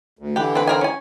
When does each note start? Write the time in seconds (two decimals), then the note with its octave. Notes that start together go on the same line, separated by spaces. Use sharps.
0.19 D2
0.36 D3 E3 G4 B4
0.55 C4 B4
0.67 C4 A#4 G#5
0.81 C#4 G#5